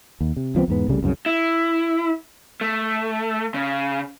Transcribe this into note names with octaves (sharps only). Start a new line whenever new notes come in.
D#2
C3
C#2 F3 B3 C4
E2 G#2 B3
C2 C#3 G3 A3
C2 F#2 A#2 C#3
E4
A3
C#3